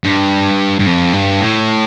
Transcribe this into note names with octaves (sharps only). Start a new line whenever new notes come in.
G2
G2
F2
G2
A2